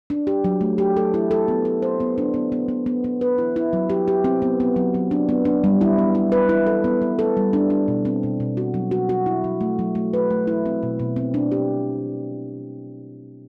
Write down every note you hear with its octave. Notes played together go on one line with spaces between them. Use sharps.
D4
G4
F#3
A3
G4
A4
E4
A4
B3
A4
C5
B3
D4
B3
B3
B3
B3
B3
B4
E4
E4
F#3
G4
G4
C4
B3
B3
F#3
F#3
D4
B3
D4
G3
E4
B3
E4
B4
E4
A4
B3
B3
A4
G3
D4
D4
B2
C4
B2
B2
F#4
F#3
F#4
F#4
E4
F#3
A3
F#3
A3
B4
A3
E4
C4
B2
B2
C4
D4
G4